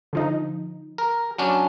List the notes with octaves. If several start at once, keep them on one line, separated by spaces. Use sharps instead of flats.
D3 F3 D#4
A#4
F#3 C#4 D4